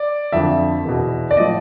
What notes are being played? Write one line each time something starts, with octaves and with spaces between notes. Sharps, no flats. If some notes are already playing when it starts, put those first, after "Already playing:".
Already playing: D5
F2 D3 F3 E5
E2 B2
D5
A2 F3 D#5